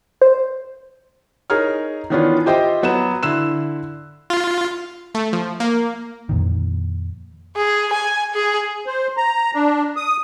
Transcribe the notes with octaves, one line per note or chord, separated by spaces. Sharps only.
C5
D#4 G#4 A#4 C#5 F6
D#3 E3 B3 C#4 D4 F4
F4 G4 C5 D#5 E5 G5
F#3 B3 F#5 E7
D3 E4 C6 E6 F#6 E7
F4
A3
F3
A#3
F2 A#2 D#3
G#4
G#5
G#4
C5
A#5
D4
D#6